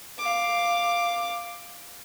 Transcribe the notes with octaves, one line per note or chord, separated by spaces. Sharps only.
F5 D6